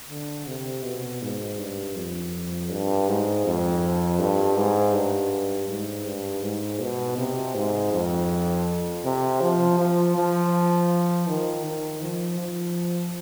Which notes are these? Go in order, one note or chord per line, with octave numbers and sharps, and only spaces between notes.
D3
C3
B2
G#2
G2
F2
G2
G#2
F2
G2
G#2
G2
G#2
G2
G#2
B2
C3
G#2
F2
C3
F3
F3
F3
D#3
D#3
F3
F3